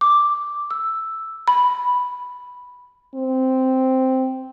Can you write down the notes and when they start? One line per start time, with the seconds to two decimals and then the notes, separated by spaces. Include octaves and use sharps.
0.01 D6
0.71 E6
1.48 B5
3.15 C4